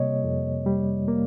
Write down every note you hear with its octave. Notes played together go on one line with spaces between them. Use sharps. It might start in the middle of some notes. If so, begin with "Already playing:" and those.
Already playing: C3 G3 A#3 C#5 D#5
F2
G3
A#3